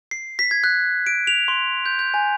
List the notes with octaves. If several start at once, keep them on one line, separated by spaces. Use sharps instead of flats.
C7
B6
G#6
F#6
D7
F7
C6
G6
G6
G#5